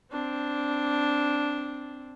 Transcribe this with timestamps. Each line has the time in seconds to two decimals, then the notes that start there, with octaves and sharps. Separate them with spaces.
0.12 C4 D4